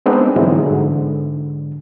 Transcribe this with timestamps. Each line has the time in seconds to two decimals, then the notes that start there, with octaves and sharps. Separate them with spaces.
0.06 G#3 B3 C4 D4 D#4
0.36 G#2 D3 E3 F#3 G#3
0.66 G#2 D3